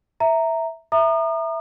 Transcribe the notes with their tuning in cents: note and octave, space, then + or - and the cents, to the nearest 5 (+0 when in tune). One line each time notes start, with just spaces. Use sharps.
E5 -5 A#5 -10
E5 +0 A#5 +0 D#6 -40